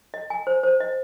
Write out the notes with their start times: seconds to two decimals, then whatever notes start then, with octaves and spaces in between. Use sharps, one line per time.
0.14 D#5
0.30 G#5
0.47 C5
0.63 C5
0.80 D#5